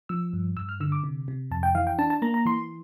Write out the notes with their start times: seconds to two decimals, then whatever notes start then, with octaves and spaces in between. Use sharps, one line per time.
0.09 F3 E6
0.33 G2
0.57 G2 E6
0.69 F6
0.80 D3 E6
0.92 D6
1.04 C3
1.28 C3
1.51 F2 A5
1.63 G5
1.75 E3 F5
1.87 G5
1.98 D4 A5
2.10 A5
2.22 A#3 A#5
2.34 A#5
2.45 E3 C6